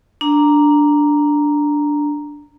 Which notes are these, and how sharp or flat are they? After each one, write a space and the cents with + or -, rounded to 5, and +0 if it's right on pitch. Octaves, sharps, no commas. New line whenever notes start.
D4 +0 A#5 +0